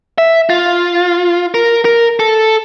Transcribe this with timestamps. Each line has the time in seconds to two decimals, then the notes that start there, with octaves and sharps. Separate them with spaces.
0.18 E5
0.50 F4
1.54 A#4
1.85 A#4
2.20 A4